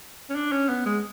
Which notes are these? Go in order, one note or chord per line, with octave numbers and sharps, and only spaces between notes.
C#4
D4
C#4
B3
G#3